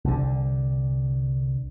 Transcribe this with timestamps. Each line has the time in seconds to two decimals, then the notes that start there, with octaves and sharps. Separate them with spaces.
0.04 C2 D3